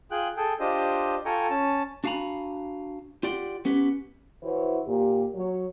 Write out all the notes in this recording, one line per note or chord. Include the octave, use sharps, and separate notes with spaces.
F4 G#4 G5 F#6
G#4 A4 G5
D4 F4 G4 C5 D#5
F4 A4 G5 G#5 A#5 C#6
C#4 A5
D4 F#4 F5 G#5 A#5 B5
F4 G4 D5 F#5 G5 C6
B3 C#4 G4 B4
E3 E4 F#4 C5 C#5
A#2 G4
F#3 C#5